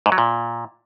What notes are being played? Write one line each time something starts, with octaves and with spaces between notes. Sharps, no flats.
G#2
F#3
A#2